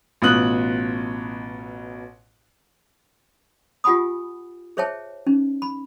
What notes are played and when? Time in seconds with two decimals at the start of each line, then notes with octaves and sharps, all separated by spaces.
0.22 A1 B2 F4 D#6 F#6 F#7
3.84 F4 G4 F#5 G#5 B5 D#6
4.77 G#4 C5 C#5 E5 G5 A5
5.26 C#4 D#4
5.62 B5